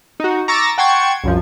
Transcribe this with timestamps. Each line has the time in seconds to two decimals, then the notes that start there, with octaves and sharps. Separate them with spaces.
0.20 D#4 F#4
0.48 A#5 C#6 D6 E6 A6 A#6
0.78 F#5 G5 A5 C6 C#6 G#6
1.24 C2 F#2 F3